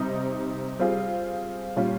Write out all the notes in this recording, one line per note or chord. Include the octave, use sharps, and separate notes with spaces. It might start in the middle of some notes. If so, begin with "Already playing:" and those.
Already playing: C3 G3 C4 D#4
G3 C4 F4 G#4
A#2 G3 C#4 F4